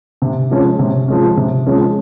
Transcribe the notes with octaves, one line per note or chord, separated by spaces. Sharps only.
C3
F3 G#3 C#4
C3
F3 G#3 C#4
C3
F3 G#3 C#4